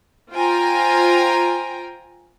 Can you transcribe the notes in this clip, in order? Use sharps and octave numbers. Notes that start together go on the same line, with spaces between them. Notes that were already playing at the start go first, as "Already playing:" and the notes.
F4 C5 G5 G#5 A#5